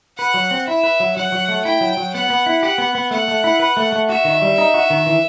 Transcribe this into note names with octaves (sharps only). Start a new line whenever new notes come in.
B4 F#5
F#3
C4
E4 E5
B4
F#3
F#3 F#5
F#3
A3
E4 G5
F#3
F#3
B3 F#5
B3
E4
G4 F#5
B3
B3
A3 F#5
A3
E4
B4
A3
A3
F#4 E5
D#3
G3
D#4
F#4
D#3
E3